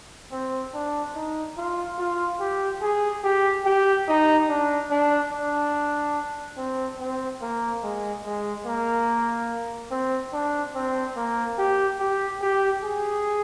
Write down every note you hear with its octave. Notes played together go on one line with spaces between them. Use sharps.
C4
D4
D#4
F4
F4
G4
G#4
G4
G4
D#4
D4
D4
D4
C4
C4
A#3
G#3
G#3
A#3
C4
D4
C4
A#3
G4
G4
G4
G#4